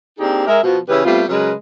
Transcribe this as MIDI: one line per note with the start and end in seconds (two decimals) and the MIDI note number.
0.19 0.46 58
0.19 0.46 60
0.19 0.46 62
0.19 0.46 63
0.19 0.46 67
0.19 0.46 68
0.47 0.61 56
0.47 0.61 70
0.47 0.61 76
0.63 0.79 47
0.63 0.79 53
0.63 0.79 66
0.88 1.03 49
0.88 1.03 52
0.88 1.03 61
0.88 1.03 64
0.88 1.03 67
0.88 1.03 71
1.05 1.23 55
1.05 1.23 57
1.05 1.23 59
1.05 1.23 60
1.05 1.23 65
1.05 1.23 67
1.29 1.52 49
1.29 1.52 54
1.29 1.52 56
1.29 1.52 70
1.29 1.52 71